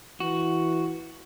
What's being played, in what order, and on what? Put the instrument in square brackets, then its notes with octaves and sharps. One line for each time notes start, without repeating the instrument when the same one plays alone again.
[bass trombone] E3 [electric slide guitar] F#4